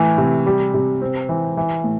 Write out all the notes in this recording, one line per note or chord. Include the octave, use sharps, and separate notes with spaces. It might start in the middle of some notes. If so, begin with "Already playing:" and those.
Already playing: A2 E3
C3
G3
C3
C4
E3
E3
A2